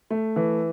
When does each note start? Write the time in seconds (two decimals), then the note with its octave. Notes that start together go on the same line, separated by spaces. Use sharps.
0.10 A3
0.36 E3